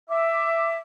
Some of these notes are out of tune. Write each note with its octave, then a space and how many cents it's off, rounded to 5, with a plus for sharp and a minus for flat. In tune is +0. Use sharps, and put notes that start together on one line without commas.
E5 +10 D6 +5